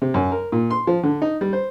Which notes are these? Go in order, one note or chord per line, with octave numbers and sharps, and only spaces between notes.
C3
F#2
A#4
A#2
C6
F3
D3
D#4
G3
C5